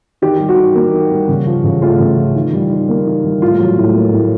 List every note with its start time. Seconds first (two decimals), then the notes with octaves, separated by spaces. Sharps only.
0.22 D#3 G4
0.40 G3
0.49 F#4
0.57 D#3
0.75 A#3
0.93 D#3
1.11 G3
1.29 C#3
1.47 F3
1.64 C#3
1.82 A3 F4
2.00 C#3
2.17 F3
2.36 D#3
2.53 G3
2.71 D#3
2.89 A#3
3.06 D#3
3.24 G3
3.42 A2 F4
3.60 F#3
3.78 A2
3.95 A#3
4.13 A2